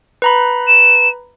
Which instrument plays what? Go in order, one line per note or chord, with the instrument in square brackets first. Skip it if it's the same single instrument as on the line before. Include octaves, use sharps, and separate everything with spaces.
[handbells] B4 A#5 B5
[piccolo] E7